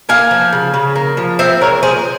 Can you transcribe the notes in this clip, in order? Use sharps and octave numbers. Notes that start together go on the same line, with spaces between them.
A#3 F5 G#5
F3
C#3
C#3
A#3
F3
C4 C5 E5
G#3 A#4 C#5
F3 G#4 C5